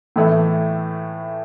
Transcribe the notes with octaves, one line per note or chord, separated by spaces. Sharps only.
A2 E3 A3